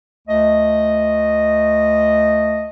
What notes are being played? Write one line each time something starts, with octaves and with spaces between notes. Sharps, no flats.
D2 A3 D#5